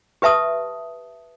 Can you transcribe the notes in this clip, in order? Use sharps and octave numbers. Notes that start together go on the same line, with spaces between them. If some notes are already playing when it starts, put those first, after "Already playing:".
G4 B4 E5 A5 D#6